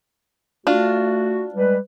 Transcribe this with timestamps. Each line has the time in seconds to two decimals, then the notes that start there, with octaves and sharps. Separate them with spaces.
0.67 A3 D4 F4 F#4
1.54 G3 G#3 B4